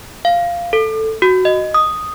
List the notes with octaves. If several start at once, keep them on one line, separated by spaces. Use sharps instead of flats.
F5
A4
F#4
D#5
D#6